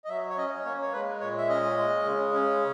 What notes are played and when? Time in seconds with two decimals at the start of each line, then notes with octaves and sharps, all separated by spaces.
0.05 D#5
0.08 F#3 E5
0.29 C#5
0.37 C#4 D#5
0.65 A#3 C#5
0.82 C#5
0.93 G#3 B4
1.20 A#2 C#5
1.37 E5
1.49 C#4 D#5
1.77 G#3
2.04 C#3
2.33 C#4